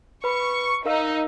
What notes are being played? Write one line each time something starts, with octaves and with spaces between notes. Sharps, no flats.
B4 B5 C#6
D#4 A#4 F5 E6